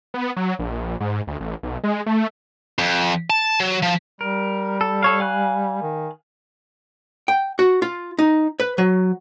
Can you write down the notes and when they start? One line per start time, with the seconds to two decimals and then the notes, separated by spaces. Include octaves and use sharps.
0.14 B3
0.37 F#3
0.59 A#1
1.01 G#2
1.27 D2
1.40 A1
1.63 B1
1.84 G#3
2.06 A3
2.79 F2
3.30 A5
3.60 F#3
3.83 F3
4.21 G3 A#4
4.81 A4
5.03 A4 C#5 F5
5.20 F5 G#5 F#6
5.82 D#3
7.28 G5
7.59 F#4
7.82 F4
8.19 D#4
8.60 B4
8.78 F#3